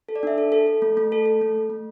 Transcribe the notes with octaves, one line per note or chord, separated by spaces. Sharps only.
A4
D5
D4 E5
A4
A4
A4
A3
A3
A4
A4
A3
A3
A3